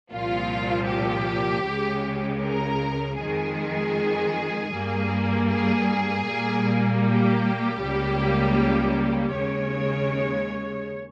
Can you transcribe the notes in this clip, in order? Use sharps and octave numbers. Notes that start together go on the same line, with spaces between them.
C2 A#2 F3 F4
G4
C#2 C#3 G#3
A#4
F2 D#3 G#3 G#4
G2 G3 A#3
G#4
A#2 G3 A#3
G4
C#2 C#3 G3 A#3
D#2 C#3 G#3 C#5